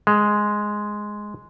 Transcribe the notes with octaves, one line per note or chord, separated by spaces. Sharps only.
G#3